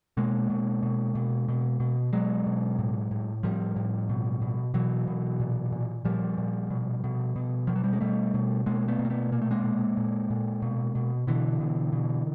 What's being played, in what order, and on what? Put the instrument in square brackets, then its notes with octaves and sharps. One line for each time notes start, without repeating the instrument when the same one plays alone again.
[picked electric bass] B2 G#3 A#3
B2
B2
B2
B2
B2
B2 F#3 G#3
B2
A2
A2
A2 F3 G3
A2
B2
B2
B2 E3 F#3
B2
A#2
A#2
A#2 F3 G3
A#2
B2
B2
B2
B2 F3
F#3
G3
G#3
B2 G3 A3
B2
B2 G#3 A#3
A3 B3
B2
A#3
A3 B3
A#2 A#3
A3
G#3 A#3
A#2
A#2
A#2
B2
B2
B2 D3 E3
B2
B2